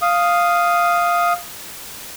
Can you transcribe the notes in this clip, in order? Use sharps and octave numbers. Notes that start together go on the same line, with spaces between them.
F5 D#6